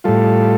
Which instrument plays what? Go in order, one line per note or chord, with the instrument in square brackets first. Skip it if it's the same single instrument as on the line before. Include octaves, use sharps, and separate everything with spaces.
[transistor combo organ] A2 G3 F4 A4